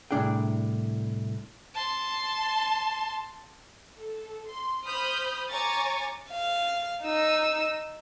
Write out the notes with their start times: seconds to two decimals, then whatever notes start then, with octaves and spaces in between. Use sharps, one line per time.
0.11 C2 A2 D4 G#4 G5
1.74 A5 C6
3.97 A4
4.48 C6
4.84 C5 B5 D#6 F6 G6
5.50 C#5 G#5 A#5 C#6 D6 A6
6.31 F5
7.03 D#4 E6